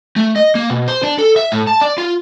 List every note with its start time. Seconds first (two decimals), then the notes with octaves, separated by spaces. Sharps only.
0.16 A3
0.36 D#5
0.55 A#3
0.70 B2
0.88 C5
1.03 D4
1.18 A4
1.36 E5
1.52 A2
1.67 A5
1.81 D5
1.98 F4